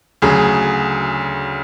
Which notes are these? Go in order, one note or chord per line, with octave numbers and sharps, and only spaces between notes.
D2 C#3 F#3 G#4